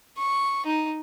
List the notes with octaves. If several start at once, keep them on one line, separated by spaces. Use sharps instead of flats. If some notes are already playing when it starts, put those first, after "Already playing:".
C#6
D#4